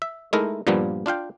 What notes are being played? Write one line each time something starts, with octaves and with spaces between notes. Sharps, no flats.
E5
G#3 A3 D#4 E4 A#4
G2 A#2 F3 G3 A#3 B3
D4 F4 F5 G5